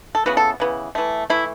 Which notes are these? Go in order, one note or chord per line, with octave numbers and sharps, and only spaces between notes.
A4
C#3 E3 B3 F#4
A4
C#3 E3 B3
E3 A3
E3 A3 E4